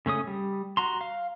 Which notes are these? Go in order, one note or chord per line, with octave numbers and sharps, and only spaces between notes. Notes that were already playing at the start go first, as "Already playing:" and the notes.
C#3 A3 C#4 D#6
G3
F#4 A#5 C6
F5